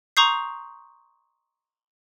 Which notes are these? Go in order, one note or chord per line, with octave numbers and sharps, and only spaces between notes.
A#5 C6 C#6 D#6 G6 C7